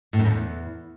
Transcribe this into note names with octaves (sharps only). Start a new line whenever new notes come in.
A2
F#2
F2
E2